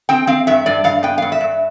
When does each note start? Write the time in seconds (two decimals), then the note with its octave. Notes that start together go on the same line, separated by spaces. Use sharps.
0.09 C4 G5
0.27 C4 F5
0.47 G2 E5
0.66 G2 D5
0.84 G2 F5
1.03 B3 G5
1.18 G2 F5
1.32 E5
1.41 G2